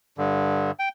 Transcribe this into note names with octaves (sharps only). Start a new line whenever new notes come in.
G2 D3
G5